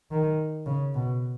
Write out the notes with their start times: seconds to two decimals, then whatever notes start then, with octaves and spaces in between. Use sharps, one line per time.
0.11 D#3
0.66 C#3
0.94 B2